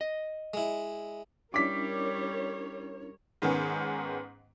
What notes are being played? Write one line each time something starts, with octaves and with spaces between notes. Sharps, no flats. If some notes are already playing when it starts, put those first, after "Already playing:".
D#5
G#3 E4
G3 C#4 D4 E4 A#4 C#5 D6 B6
G#2 D#3 B3 C#4